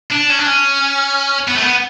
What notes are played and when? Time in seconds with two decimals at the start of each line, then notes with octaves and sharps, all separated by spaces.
0.12 D4
0.31 C#4
0.39 D4
0.47 C#4
1.48 B3
1.55 A3
1.62 B3